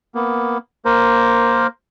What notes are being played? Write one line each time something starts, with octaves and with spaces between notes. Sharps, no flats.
A#3 B3
A#3 A#4 C5